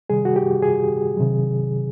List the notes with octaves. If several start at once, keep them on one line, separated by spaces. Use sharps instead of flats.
C3 D#3 G3 G#4
F#4
G4
G#4
C3 D#3 F#3